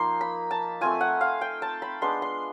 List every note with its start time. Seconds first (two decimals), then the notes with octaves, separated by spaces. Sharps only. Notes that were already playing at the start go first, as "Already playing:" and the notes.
Already playing: F3 A#3 D#4 C6
0.21 B5
0.51 A5
0.81 A3 C4 F4 G#5
1.01 F#5
1.21 F5
1.41 G5
1.62 A5
1.82 B5
2.01 G#3 B3 D4 C6
2.22 C6